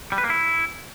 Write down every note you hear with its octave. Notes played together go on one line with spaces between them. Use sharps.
G3
B4
A#3
E4